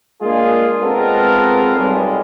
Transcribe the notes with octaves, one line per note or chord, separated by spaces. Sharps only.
G#3 A#3 D4 F4 G#4
G#3 B3 C4 F4 A4 A#4
B1 G3 G#3